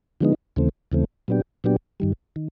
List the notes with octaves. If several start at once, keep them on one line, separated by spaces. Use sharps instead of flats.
D3 F3 G#3 B3 D#4
D#2 C#3 E3 A3 C4
D#2 C#3 E3 A3 C4
A#2 F#3 B3 D4 G4
A#2 F#3 B3 D4 G4
G2 D#3 G3
D#3